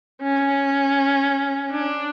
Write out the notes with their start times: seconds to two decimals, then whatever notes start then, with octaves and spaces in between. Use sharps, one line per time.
0.22 C#4
1.71 D4